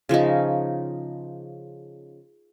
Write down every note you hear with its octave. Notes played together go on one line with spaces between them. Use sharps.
C#3 F3 C#4 D#4